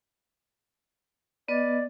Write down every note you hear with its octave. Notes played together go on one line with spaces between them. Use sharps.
B3 B4 D5 D#5